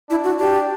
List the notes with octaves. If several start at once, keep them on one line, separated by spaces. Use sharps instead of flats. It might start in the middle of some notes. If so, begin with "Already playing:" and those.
D4 E4
F#4
D4 G4